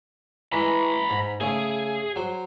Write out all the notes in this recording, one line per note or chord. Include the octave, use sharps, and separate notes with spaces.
E3 G#3 A#5 B5
G#2
C#3 A3 G#4
F#3 C5